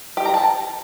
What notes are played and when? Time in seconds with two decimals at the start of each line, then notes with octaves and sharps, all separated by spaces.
0.17 G4
0.26 A#5
0.34 A5